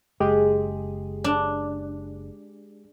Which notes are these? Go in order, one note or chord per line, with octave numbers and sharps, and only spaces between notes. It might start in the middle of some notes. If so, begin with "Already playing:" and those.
F#1 G#3 G4 G#4
D4